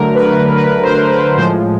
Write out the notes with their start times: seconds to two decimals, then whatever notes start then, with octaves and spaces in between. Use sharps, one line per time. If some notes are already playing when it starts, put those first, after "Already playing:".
Already playing: D3 F#3 A3 A#4
0.15 B4
0.56 B4
0.83 C5
1.09 B4
1.37 A2 F3 G#3 C5